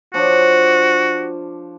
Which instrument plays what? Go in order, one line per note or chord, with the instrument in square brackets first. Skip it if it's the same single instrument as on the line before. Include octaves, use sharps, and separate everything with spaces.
[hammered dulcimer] F3 D4 C#5 [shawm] F#4